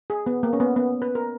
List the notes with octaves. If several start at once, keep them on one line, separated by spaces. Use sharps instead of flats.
G#4
B3
A#3
C#4
B3
B3
B4
A#4